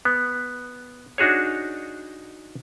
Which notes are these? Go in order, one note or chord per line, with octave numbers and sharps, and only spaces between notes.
B3
D4 D#4 F#4 G#4 C#5